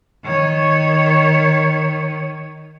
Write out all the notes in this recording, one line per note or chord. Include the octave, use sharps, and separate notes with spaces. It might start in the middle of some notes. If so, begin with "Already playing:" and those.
D#3 C#5